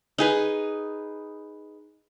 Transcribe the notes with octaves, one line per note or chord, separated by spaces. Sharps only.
D#4 G#4 B4